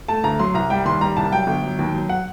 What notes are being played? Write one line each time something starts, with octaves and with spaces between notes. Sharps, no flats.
A3 A5
D2 A#5
F#3 C6
C2 A#5
G3 G5
D#2 C6
G3 A#5
C2 A5
F#3 G5
G1
F#3
D#2
F#3
F#5